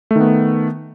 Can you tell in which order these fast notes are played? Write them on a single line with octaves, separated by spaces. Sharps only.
A3 D#3 B3